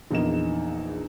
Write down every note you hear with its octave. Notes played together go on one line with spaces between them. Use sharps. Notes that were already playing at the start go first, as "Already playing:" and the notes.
A#1 E2 A#3 D#4 E7